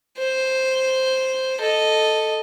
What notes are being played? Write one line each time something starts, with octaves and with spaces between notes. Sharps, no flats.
C5
A4 D#5